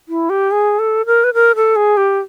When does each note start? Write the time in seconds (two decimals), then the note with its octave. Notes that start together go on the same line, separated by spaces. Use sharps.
0.09 E4
0.30 G4
0.51 G#4
0.79 A4
1.06 A#4
1.24 B4
1.34 A#4
1.56 A4
1.76 G#4
1.97 G4